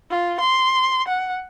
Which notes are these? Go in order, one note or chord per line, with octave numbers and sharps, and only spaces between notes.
F4
C6
F#5